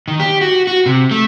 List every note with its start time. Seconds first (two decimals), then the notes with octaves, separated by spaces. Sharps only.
0.08 D#3
0.20 G4
0.41 F#4
0.67 F#4
0.86 C3
1.11 A3